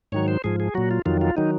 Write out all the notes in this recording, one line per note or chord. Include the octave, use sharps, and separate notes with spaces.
G#2 D#3 F#3 C#5
C5
G#2 F3 G#4
G#4
A#2 F#3 F#4
F4
F2 D#3 F#3 F4
F4
D#3 F#3 D#4